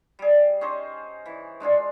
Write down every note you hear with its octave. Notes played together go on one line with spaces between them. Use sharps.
G3 G#4
C#4 D#4 C5 D#5
E3
G#3 D4 F4 G#4